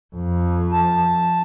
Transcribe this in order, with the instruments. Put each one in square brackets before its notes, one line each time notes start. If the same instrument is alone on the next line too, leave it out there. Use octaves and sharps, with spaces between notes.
[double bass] F2
[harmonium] A5